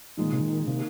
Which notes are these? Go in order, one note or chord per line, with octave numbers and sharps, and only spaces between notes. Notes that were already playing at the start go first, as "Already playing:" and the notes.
A#2 F3 G#3 D#4
D#3
C3
D#3
C3 D#3 A#3 D#4